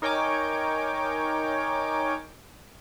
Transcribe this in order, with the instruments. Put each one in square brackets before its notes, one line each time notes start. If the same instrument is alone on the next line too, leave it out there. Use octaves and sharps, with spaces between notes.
[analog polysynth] D#4 A#4 C#5 G5 G#5 D6